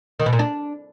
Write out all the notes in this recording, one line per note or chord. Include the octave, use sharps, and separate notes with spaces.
D#3
B2
A#2
D4